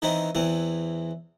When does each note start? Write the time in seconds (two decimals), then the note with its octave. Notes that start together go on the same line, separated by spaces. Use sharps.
0.02 D#3 E3 B3 C4 D#4
0.35 E2 E3 C4